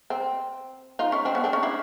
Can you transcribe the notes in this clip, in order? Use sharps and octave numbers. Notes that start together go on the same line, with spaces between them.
C4
D#4 F4
C#4 D#4
C4 D4
B3 C#4
C4 D4
C#4 D#4
D4 E4